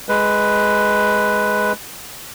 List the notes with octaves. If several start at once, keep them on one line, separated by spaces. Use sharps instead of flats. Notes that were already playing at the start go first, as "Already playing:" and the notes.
G#3 B4